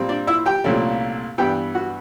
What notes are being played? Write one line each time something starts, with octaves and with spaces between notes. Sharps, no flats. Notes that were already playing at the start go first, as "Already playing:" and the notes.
Already playing: A#2 G3 C4
D4 D5
E4 E5
G4 G5
C2 A#2 F3 A3 C#4
G2 E3 G3 B3 G4 G5
F#4 F#5